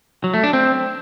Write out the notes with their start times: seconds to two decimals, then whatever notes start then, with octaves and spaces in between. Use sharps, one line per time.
0.24 F#3
0.34 A3
0.43 D4
0.53 C4